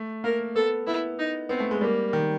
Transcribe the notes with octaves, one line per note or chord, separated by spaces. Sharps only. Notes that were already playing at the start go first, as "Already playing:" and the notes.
Already playing: A3
A#3 A#4
B3 A4
B3 E4
D#4
B3 C4
A3
G#3
G3 A#3
D#3